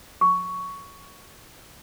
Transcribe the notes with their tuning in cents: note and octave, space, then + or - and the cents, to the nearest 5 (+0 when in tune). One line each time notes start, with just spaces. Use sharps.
C#6 +10